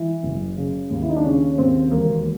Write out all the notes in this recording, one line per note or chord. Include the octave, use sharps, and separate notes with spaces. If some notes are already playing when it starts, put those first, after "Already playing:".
Already playing: E3
F#1
C#3
D#2
E4
D#4
D4
C#3 C#4
D#2 C4
E1 A#3